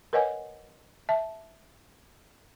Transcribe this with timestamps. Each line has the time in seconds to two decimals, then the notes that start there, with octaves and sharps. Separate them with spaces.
0.13 A#4 B4 C#5 D#5 F#5 G#5
1.09 E5 A5